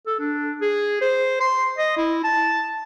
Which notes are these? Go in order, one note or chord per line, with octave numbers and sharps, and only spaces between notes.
A4
D4
G#4
C5
C6
D#5
E4
A5